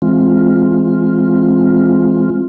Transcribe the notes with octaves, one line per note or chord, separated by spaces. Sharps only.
E3 G#3 C4 F4